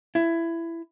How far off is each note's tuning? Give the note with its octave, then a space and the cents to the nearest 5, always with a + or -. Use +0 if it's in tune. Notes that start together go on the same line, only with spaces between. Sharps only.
E4 +15